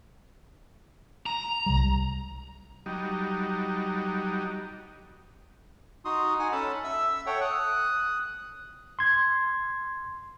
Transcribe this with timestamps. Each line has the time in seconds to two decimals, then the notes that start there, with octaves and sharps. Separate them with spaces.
1.26 A#5
1.66 C2 G3
2.86 F#3 G3 D#4
6.05 D#4 F#4 C6 D#6
6.39 D#4 F#5 G#5
6.52 C#4 A4 A5 B5
6.84 E5 E6
7.26 A4 C#5 F#5 G5
7.41 D#6 F#6
8.99 C6 G#6